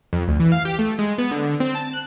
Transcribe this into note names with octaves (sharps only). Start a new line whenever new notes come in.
F2
D2
E3
F5
G4
A3
G#3
B3
D3
C4
A5
F#6